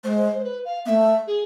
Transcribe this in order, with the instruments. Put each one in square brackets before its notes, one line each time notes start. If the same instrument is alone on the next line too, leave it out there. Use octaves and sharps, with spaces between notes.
[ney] G#3 A3 [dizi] C5
[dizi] C5
C5
B4
F5
[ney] A3 B3 [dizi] E5
[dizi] G#4